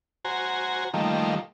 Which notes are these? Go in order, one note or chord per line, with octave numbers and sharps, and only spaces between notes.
F#4 C5 G#5 A#5
D#3 F3 G3 A3 A#3